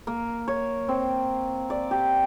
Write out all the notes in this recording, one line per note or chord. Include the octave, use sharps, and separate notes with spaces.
A#3
C#5
C4
D5
G4